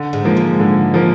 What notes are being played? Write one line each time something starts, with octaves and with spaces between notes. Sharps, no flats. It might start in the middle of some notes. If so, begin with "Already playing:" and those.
Already playing: D3
G#2 G#3
F3 A#3
G#2 G#3
D3
F3 A#3